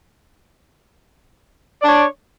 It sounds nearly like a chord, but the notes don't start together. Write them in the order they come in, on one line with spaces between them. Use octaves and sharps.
D5 D4 C#5